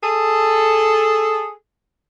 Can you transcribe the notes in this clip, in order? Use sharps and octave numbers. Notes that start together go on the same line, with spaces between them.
G#4 A4